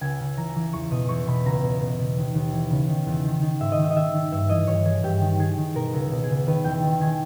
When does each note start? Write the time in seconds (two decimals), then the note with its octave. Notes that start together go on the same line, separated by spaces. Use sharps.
0.01 C#2 G#5
0.20 C#3
0.37 E3 A#5
0.56 E3
0.73 E2 C#6
0.91 B2 D#6
1.09 E2 C#6
1.27 B2 B5
1.45 C#2 A#5
1.63 B2
1.81 B2
1.98 B2
2.17 D#2
2.34 D#2
2.53 E3
2.71 C#3
2.88 D#3
3.06 E2
3.24 D#3
3.42 D#3
3.60 G#2 E5
3.72 D#5
3.78 D#3
3.84 E5
3.90 D#5
3.96 D#3 E5
4.14 D#3
4.32 G2 E5
4.49 E3 D#5
4.67 G2 C#5
4.86 E3 G#4
5.03 G2 G4
5.21 D#3
5.39 D#3 G#4
5.58 D#3
5.75 B2 A#4
5.93 C#2
6.11 B2
6.24 G#4
6.30 C#2
6.47 D#3 B4
6.64 E2 G5
6.83 D#3
7.01 D#3 G#5